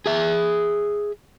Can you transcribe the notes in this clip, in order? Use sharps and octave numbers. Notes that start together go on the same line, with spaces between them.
G#4 E5